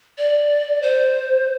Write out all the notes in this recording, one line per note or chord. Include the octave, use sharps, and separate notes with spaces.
D5
C5